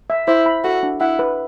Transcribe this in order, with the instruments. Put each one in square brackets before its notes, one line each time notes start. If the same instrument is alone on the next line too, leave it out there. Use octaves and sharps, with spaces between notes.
[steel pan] E5
[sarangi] E4 [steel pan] C5
[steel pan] B5
[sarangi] F#4 [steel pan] A4
[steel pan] D4
[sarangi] E4 [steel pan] F#5
[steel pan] B4